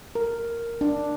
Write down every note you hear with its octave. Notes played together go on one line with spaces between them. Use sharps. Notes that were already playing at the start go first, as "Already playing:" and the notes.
A#4
D4